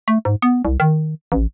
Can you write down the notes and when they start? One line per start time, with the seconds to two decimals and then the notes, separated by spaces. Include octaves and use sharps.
0.08 A3
0.25 G#2
0.42 B3
0.65 C2
0.80 D#3
1.32 A1